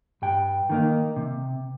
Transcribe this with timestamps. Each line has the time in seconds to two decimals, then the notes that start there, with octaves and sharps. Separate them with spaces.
0.22 G2 G5
0.70 D#3 A#3 D#4
1.16 C3